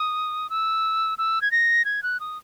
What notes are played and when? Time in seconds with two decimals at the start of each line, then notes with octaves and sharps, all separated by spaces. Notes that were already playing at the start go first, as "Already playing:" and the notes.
Already playing: D#6
0.50 E6
1.18 E6
1.42 G#6
1.52 A#6
1.85 G#6
2.03 F#6
2.20 D#6